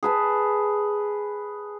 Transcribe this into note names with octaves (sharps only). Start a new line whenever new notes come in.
G#4 B4 A5